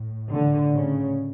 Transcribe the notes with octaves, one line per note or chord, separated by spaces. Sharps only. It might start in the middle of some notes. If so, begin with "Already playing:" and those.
Already playing: A2
D3
C#3